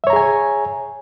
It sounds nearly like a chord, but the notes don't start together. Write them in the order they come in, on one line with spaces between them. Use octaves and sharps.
E5 C#5 A#5 G#4 G#5